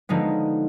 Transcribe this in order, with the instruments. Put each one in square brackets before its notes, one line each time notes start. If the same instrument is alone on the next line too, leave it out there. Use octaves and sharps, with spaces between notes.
[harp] D3 F3 G#3 B3 D#4